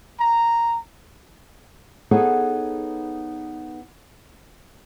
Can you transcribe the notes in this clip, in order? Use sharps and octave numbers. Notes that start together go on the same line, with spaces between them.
A#5
B3 D#4 G#4 A4 C#5